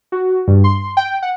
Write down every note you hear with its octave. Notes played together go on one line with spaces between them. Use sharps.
F#4
G2
C6
G5
F#5